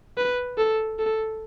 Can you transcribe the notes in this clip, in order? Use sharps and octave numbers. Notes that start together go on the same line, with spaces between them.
B4
A4
A4